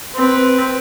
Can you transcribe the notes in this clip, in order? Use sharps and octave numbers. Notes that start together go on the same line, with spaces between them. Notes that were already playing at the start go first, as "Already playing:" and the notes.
C4 B4